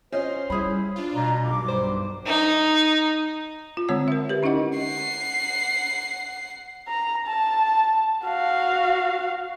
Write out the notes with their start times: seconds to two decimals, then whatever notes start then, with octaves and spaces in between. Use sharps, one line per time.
0.12 C#4 F4 C5 D#5
0.50 G3 E4 G#4 B5
0.96 D4 F4
1.15 B2 A#5
1.46 B1 G2 D6
1.68 G3 C5
2.26 D#4
3.77 F4
3.89 D3 G#3 C4 C#5 A5 E6
4.08 A#4 E5
4.29 G4 A#4 B4
4.43 C#4 D#4 E4 D#5 F#5
4.77 F#5 C7
6.88 A#5
7.27 A5
8.25 F#4 F5